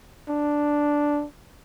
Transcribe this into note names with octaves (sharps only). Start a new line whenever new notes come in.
D4